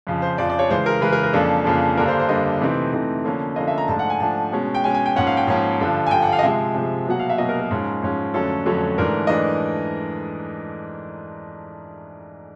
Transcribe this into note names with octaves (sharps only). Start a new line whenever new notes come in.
F2 C#3 F3
C5
F2 C#3 F3 D5
D5
C#5
C#3 E3 G#3 C5
A#4
C#3 E3 G#3 B4
A#4
A#4
F2 C#3 F3 A#3 D4 A4
F2 C#3 F3 A#3 D4
G2 D3 G3 A#3 D4 A#4
C5
C5
G2 D3 G3 A#3 D4 D#5
C3 E3 A3 C4 D#4
C3 E3 A3 C4 D#4
D3 F3 A#3 C#4
D3 F3 A#3 C#4 D#5
E5
A#5
G#2 F3 A3 D4 A5
F#5
G#5
G#2 F3 A3 D4 A5
B2 G#3 C#4
G5
B2 G#3 C#4 G#5
G#5
G5
G#2 F3 A#3 C#4 F#5
F5
G5
G#2 F3 A#3 C#4
G2 D3 F3
G#5
G2 D3 F3 G5
F#5
F5
D#5
C3 F3 G#3 E5
C3 F3 G#3
B2 F#3 A#3 F#5
F5
E5
B2 F#3 A#3 D#5
A#4
A#4
G#2 F3 G#3 C#4
G#2 F3 G#3 C#4
F2 D3 F#3 A3 C#4 A4
F2 D3 F#3 A3 C#4
G#2 E3 A3 D4 A#4
E3 A3 D4 D#5